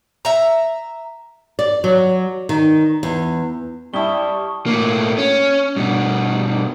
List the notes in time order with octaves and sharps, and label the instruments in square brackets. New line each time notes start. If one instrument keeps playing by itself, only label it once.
[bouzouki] E5 A#5
[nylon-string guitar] D5
F#3
D#3
E2
[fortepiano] G2 E4 [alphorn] G3 [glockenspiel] A5 D#6 G7 [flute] C#6
[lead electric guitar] A2 A#3
C#4
G2 B2